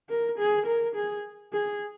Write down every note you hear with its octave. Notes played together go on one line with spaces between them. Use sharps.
A#4
G#4
A#4
G#4
G#4